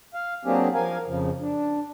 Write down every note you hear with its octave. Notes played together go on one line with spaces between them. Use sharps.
F5
F#3 A#3 C4 D4 G4 G#4
F3 A#4 F5 G#5
F2 C#3 F3
D4